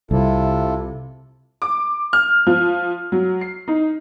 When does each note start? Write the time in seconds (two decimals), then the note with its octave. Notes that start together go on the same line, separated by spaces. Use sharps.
0.11 C2 C3 E4 F4 A4
1.62 D6
2.13 F6
2.47 F3
3.12 F#3
3.41 C7
3.68 D#4